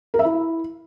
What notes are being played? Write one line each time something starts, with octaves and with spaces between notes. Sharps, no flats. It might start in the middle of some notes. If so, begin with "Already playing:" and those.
A#4
E5
E4